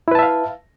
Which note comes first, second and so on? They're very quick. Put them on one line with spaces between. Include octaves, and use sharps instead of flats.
E4 B4 A5 E5 F5